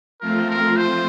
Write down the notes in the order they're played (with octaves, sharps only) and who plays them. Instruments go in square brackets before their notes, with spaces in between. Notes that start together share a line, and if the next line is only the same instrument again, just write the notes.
[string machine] F3 A3 C4 F4 [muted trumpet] A#4
[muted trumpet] A#4
C5